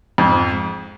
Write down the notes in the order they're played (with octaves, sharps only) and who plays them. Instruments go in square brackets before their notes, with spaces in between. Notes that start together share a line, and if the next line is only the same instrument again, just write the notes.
[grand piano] F2 G#2